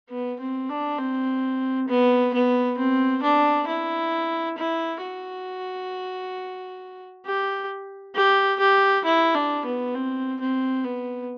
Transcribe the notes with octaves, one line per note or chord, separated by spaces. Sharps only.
B3
C4
D4
C4
B3
B3
C4
D4
E4
E4
F#4
G4
G4
G4
E4
D4
B3
C4
C4
B3